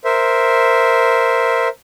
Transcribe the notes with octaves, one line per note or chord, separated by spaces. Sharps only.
A#4 C5 E5